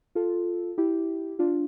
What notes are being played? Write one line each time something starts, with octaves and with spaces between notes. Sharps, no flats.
F4 A4
E4 G4
D4 F4